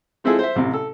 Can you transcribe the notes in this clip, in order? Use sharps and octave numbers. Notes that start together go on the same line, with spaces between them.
G#3 C4 E4 F4 G#4 A4
C5 E5
A1 C3
A4